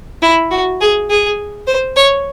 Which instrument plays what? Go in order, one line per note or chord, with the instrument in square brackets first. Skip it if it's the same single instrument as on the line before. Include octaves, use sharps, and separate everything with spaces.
[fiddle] E4
F#4
G#4
G#4
C5
C#5